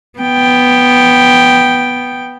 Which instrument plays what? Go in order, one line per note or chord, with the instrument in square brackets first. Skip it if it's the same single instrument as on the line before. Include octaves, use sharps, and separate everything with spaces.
[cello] B3 G5